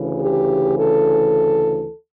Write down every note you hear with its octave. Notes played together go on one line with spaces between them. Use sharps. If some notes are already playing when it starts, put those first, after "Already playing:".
Already playing: D2 C#3 E3
G4
A4